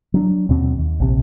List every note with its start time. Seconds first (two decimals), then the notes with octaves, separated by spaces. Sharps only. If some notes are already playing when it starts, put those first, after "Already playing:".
0.14 F#3 D4
0.49 D#2 B2 C4
0.78 D#2
1.00 A#1 C3